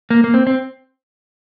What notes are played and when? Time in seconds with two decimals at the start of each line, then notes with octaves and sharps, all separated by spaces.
0.10 A#3
0.24 A#3
0.34 C4
0.47 C4